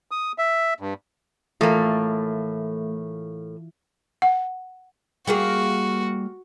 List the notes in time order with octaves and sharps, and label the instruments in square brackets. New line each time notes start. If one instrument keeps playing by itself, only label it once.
[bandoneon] D#6
E5
G2
[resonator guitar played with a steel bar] A2 A#3 [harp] E3 F4 [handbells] A3 [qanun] A4
[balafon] F#5
[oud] G3 A#3 G#4 [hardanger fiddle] F#4